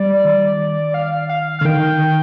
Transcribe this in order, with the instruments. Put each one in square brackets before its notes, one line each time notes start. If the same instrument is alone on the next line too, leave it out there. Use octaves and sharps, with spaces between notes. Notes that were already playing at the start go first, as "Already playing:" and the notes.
Already playing: [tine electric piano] G3 [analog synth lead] D5
[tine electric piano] D#3
[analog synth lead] F5
F5
[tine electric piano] D3 [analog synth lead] F5
[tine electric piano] D#3 [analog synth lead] G5